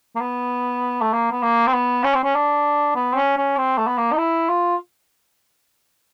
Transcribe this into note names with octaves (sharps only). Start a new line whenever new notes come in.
A#3
B3
A3
A#3
B3
A#3
C4
B3
C#4
C4
C#4
D4
B3
C4
C#4
C#4
C4
A3
B3
A#3
D#4
E4
F4